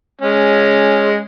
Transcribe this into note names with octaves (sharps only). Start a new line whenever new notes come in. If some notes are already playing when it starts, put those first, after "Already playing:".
G#3 C#4